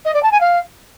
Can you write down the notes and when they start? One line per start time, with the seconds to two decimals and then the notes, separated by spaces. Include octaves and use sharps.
0.05 D#5
0.14 D5
0.23 A5
0.31 G#5
0.40 F5